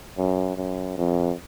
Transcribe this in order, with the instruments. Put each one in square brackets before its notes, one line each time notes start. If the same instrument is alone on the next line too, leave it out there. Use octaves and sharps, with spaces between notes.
[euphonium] F#2
F#2
F2